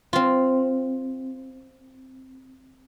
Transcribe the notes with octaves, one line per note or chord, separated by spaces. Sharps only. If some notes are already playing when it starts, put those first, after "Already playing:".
C4 F4